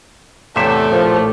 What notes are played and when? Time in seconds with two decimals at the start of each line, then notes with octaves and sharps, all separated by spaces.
0.56 E2 A2 C3 A3 G4 E5 G5
0.92 A#1 F3